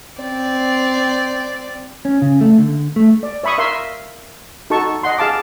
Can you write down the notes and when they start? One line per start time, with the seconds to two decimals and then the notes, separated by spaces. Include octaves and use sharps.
0.21 C4 D5
2.05 C#4
2.22 C#3
2.41 A3
2.58 D3
2.96 A3
3.23 D5
3.44 C#5 E5 B5 C#6 D#6
3.58 A#4 E5 F5 C6
4.70 D#4 F#4 A4 A5 C#6
5.03 D#5 F#5 C6
5.18 G#4 F5 A5 D6